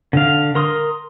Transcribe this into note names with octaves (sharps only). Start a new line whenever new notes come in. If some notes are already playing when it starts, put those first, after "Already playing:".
D3 F5
A#4 C6 D#6